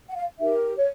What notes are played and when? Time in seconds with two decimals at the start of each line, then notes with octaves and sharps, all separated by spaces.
0.09 F#5
0.15 F5
0.39 D#4 G4 A#4 E5
0.76 C#5